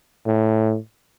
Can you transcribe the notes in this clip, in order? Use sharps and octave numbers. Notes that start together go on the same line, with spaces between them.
A2